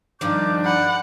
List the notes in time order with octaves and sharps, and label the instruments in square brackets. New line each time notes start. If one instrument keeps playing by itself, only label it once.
[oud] G2 D#3 F3 [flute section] D4 D#4 G6 [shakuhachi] D6
[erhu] F#5 [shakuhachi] B5